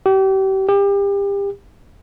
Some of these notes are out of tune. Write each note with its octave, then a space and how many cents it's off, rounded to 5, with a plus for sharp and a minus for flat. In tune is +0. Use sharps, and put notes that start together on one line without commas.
G4 -35
G4 +30